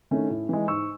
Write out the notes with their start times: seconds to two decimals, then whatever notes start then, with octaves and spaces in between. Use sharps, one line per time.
0.11 D#3 A3 C#4 E4
0.30 A2
0.49 E3 G#3
0.68 G#2 C#6 E6